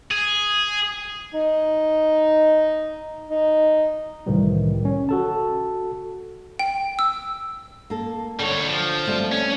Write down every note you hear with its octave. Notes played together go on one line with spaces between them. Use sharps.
G#4
D#4
D#4
C2 A2 D#3 E3 G3
C#4
F#4 A4 A5
G5
E6
A#3 A4
D3 G3 C#5
F3
G3 A3 C4
C#4